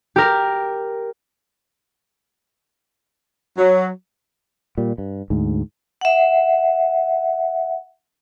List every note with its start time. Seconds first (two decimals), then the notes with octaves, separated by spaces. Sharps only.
0.16 G4 A#4
3.58 F#3
4.78 A#2 G3
4.98 G2
5.30 D2 G#2
6.01 E5 F#5